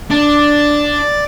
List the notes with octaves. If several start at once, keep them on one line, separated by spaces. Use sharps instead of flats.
D4 D5 A6